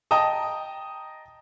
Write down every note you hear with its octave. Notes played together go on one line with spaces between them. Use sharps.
D#5 G5 A5 A#5 D#6